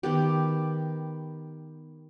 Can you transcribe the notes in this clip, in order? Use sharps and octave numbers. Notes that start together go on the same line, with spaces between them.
D#3 B3 G4